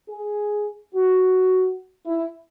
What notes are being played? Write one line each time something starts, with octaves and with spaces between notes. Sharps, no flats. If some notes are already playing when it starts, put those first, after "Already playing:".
G#4
F#4
E4